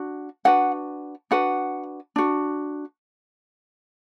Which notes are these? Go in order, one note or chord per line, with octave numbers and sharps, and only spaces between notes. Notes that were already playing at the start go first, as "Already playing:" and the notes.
Already playing: D4 F#4
D4 F#4 B4 F#5
D4 F#4 B4 F#5
D4 F#4